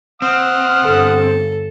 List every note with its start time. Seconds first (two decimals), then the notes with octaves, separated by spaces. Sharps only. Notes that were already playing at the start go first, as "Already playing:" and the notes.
0.22 C4 F#5 D#6 F6
0.82 G1 A4